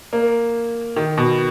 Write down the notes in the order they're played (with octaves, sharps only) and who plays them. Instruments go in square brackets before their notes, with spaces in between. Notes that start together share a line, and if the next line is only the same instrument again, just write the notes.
[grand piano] A#3
D#3
B2